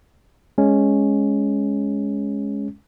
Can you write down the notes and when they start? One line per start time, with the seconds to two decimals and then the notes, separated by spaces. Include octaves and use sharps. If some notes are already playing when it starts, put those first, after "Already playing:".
0.58 G#3 C#4